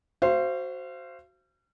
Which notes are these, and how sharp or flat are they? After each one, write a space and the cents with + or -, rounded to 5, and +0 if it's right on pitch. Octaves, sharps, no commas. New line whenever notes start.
F#4 +5 C5 +0 F5 -40